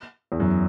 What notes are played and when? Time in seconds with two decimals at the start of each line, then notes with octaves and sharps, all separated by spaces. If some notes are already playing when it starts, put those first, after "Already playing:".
0.32 E2
0.40 F#2